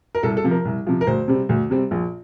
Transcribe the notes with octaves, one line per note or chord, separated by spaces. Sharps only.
A#4
C2 A4
A4
C3 F3
A#4
C2
C3 F3
A#4
D2 C5
C3 G3 C4
D2
C3 G3 C4
A#1